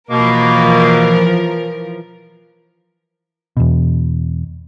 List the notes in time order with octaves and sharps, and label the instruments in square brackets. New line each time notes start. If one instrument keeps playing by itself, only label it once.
[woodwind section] B2 A#3 [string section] E3 F3 A#4
[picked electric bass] E2 B2